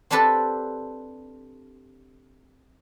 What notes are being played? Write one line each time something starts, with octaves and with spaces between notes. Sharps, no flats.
C4 D4 G4 A4 B4 D5